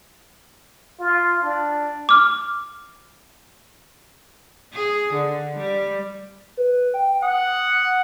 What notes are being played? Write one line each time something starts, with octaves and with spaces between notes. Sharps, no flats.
F4
D4
D6 F6
G#4
D3
G3
B4
G5
F#5 D#6